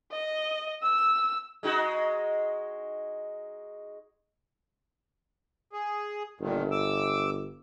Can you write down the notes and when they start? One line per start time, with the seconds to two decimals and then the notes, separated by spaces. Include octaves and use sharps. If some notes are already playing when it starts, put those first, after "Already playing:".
0.12 D#5
0.83 E6
1.63 G#3 D#4 F#4
5.73 G#4
6.40 G1 G2 A#2 D#3
6.72 D6 E6